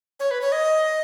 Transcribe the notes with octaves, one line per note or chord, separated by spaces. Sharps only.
C#5
B4
C#5
D#5